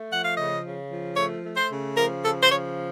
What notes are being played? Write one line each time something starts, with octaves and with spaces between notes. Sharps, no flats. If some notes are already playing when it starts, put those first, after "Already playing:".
Already playing: A3
F3 F#5
F5
C#3 D#5
C#3
F3
A3 C#5
A3
C5
C#3
F3 A#4
C#3 A4
C5
F3 C#5